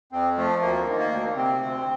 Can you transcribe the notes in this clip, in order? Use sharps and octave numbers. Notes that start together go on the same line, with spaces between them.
F2 C4
F3 A3
D2 A#3
D#3
A#3
D2
C3 C4
D2